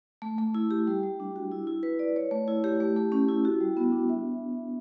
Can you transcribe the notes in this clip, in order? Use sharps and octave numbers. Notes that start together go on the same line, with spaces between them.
A3
A3
E4
G4
G3
G3
D4
F#4
E4
E4
B4
D5
C#5
A3
E4
G4
A3
A3
C#4
E4
F#4
G3
B3
D4
E5